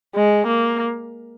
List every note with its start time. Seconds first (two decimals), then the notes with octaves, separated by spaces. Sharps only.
0.15 G#3
0.47 A#3